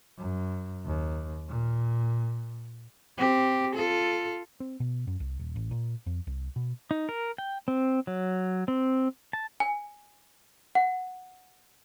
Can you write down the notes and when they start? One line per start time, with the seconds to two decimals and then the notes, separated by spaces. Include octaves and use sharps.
0.18 F#2
0.86 D#2
1.48 A#2
3.18 C4 G4
3.75 F4 A4
4.60 C4
4.80 B2
5.07 F#2
5.20 C2
5.39 D#1
5.56 A1
5.71 A#2
6.06 F2
6.27 C2
6.56 B2
6.91 D#4
7.09 A#4
7.38 G5
7.68 C4
8.07 F#3
8.68 C4
9.33 A5
9.60 G#5
10.75 F#5